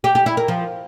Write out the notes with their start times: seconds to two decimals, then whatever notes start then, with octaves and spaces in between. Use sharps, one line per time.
0.04 G4
0.15 G4
0.26 E4
0.37 A#4
0.48 F3